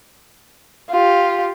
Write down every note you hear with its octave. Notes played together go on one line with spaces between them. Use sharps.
F4 G4